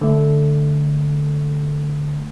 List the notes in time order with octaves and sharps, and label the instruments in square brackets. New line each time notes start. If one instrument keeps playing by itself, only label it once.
[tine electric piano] D3 A3